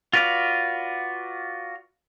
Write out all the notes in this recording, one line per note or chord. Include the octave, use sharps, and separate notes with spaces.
F4 F#4 B4 D5 F5